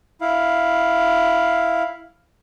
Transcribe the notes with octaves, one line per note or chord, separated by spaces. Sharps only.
E4 F5